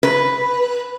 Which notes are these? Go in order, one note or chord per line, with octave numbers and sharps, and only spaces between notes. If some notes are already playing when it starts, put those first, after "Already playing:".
B4